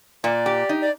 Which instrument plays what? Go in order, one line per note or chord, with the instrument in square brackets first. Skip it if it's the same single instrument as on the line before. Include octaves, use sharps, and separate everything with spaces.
[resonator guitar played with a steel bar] A#2 [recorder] D5
[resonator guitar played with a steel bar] G4
D#4
[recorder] D5